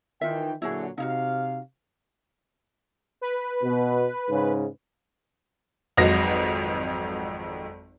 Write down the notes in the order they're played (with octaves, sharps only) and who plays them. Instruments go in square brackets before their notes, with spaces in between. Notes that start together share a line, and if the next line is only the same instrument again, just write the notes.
[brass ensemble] D#3 E3 G5 [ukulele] F4 E5
[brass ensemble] A#2 D3 F#3 [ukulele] E4 F#4 G#4
[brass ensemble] C3 F5 [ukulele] D#4 E4 F#4
[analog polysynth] B4
[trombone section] B2
G#2 C#3
[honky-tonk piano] G#1 F2 F#3 G#3 B4 A#6